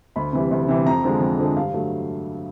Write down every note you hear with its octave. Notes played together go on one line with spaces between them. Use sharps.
D2 B5
C3 E3 G3
D2
C3 E3 G3
F2 A#5
D3 F3 G#3
F2
D3 F3 G#3
G2 F5
D3 F#3 A3